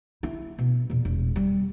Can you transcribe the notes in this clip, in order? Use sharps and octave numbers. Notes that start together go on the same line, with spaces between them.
E4
B2
E2 A#2
E1
G3